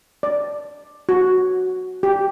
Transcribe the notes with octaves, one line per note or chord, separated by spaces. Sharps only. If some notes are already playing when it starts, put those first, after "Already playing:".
D5
F#4
G4